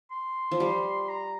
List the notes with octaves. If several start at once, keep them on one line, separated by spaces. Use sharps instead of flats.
C6
F3
G3
A#5